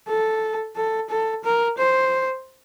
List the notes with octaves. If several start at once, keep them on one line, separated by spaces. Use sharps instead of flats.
A4
A4
A4
A#4
C5